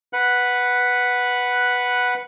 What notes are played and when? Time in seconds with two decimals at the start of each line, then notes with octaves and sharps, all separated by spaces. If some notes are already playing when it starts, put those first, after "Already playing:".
0.13 B4 F#5 F#6